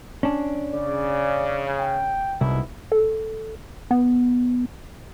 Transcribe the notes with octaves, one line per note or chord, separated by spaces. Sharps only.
C#4 D4
C#3 D5
G5
C2 G#2 B2 E4
A4
B3